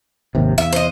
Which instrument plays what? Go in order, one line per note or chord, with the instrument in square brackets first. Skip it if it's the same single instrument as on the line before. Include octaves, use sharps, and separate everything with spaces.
[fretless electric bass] G#1 D#2 C3
[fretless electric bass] E2 [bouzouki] E5
[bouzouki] C5 D#5